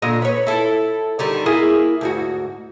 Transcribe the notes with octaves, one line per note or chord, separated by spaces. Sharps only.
A#2 D3 D#5
B4 C#5
E4 A4
D3 D#3 G3
A#3 E4 G#4
D2 G#2 F#4